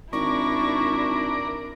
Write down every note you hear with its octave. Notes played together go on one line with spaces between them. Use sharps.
G#1 D4 E4 A#4 D5 C#6